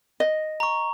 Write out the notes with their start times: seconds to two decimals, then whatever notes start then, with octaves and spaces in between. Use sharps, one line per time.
0.20 D#5
0.60 A#5 C#6